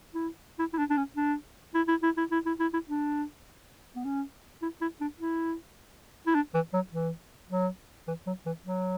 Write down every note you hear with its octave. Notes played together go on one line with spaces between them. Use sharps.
E4
E4
E4
D4
D4
C#4
D4
E4
E4
E4
E4
E4
E4
E4
E4
D4
B3
C#4
E4
E4
D4
E4
E4
D4
E3
F#3
E3
F#3
E3
F#3
E3
F#3